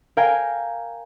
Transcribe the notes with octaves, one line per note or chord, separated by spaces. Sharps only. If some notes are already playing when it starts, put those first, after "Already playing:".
A#4 F5 G5 G#5